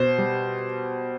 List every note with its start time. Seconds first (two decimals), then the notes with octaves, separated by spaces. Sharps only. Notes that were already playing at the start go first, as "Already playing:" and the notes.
Already playing: B2 C5
0.19 G3